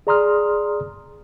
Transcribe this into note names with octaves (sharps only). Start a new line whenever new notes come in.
G#4 D5 A#5 C6 D#6 F6